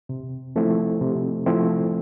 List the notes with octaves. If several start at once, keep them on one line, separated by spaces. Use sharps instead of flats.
C3
F3 A3 C4 E4
C3
F3 A3 C4 E4